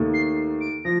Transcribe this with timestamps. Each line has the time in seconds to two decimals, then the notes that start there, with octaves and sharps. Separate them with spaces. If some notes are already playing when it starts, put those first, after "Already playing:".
Already playing: D#2 D#3 A3
0.13 C7
0.60 D7
0.84 F3 A#6